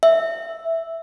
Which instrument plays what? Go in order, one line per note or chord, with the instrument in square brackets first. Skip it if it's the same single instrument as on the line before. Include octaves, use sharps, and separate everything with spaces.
[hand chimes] E5